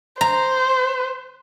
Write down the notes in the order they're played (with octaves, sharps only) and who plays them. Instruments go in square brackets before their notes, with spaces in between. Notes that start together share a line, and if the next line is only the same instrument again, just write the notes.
[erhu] C5 [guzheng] A#5